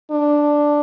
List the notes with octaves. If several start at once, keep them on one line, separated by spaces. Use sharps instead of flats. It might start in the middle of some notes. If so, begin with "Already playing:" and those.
D4